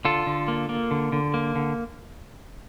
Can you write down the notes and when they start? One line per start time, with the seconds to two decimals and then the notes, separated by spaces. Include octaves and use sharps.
0.05 D3 F4 A4
0.27 D3
0.48 A#3
0.69 A#3
0.91 D3
1.12 D3
1.34 A#3
1.56 D3